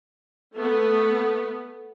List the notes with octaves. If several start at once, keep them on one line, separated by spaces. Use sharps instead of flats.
A3 B3